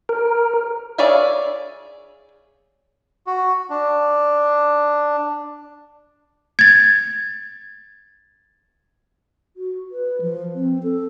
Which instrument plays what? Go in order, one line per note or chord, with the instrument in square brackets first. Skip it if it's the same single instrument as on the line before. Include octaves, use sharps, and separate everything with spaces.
[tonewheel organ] A#4
[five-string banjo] G#4 C#5 D5 E5 F5
[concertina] F#4
D4
[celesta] G#6 A6
[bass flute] F#4
B4
F3
C4
A4